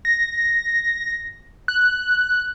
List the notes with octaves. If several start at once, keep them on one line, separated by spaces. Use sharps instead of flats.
A#6
F#6